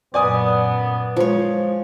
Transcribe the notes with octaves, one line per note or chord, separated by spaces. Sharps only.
F#2 A#2 B3 D5 G#5 D#6
F3 G#3 C#5